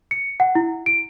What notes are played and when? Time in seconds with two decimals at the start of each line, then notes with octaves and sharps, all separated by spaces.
0.11 C#7
0.40 F#5
0.55 E4
0.86 D7